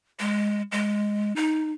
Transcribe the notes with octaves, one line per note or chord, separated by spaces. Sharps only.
G#3
G#3
D#4